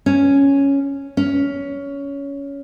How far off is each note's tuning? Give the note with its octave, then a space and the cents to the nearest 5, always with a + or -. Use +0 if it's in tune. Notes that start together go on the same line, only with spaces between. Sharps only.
C#4 +0
C#4 +15